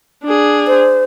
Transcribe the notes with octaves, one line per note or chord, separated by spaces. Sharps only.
D4 G#4
C5